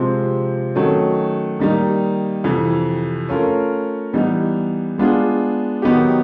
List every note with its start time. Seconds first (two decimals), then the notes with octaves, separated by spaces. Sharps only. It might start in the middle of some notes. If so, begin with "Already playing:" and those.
Already playing: C3 F3 G#3 C4
0.75 D#3 F#3 A3 C#4
1.60 D#3 G3 A#3 D#4
2.44 F2 C3 E3
3.29 A3 C#4 F4 A#4
4.13 E3 G3 B3 D#4
4.98 G#3 B3 D4 F4 G#4
5.82 D#3 F#3 B3 D#4 G4